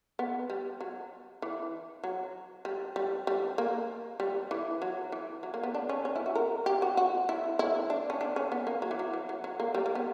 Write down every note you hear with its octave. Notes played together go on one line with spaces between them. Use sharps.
B3
G3
F#3
E3
F#3
G3
G3
G3
A#3
G3
E3
F#3
E3
F#3
A#3
B3
D4
C#4
C#4
E4
F#4
A#4
G4
F#4
F#4
E4
E4
D4
C#4
D4
C#4
B3
A#3
F#3
E3
F#3
E3
F#3
F#3
A#3
G3
A#3
B3